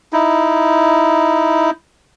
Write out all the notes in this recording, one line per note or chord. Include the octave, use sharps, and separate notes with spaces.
D#4 E4